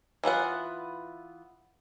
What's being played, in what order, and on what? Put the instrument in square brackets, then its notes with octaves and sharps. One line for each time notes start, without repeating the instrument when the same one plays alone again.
[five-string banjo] E3 B3 F4 F#5